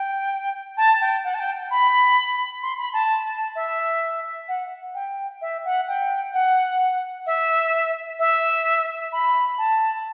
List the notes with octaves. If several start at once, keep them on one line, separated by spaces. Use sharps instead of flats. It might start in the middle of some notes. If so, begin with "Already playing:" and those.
Already playing: G5
A5
G5
F#5
A5
G5
B5
C6
B5
A5
E5
F#5
G5
E5
F#5
G5
F#5
E5
E5
B5
A5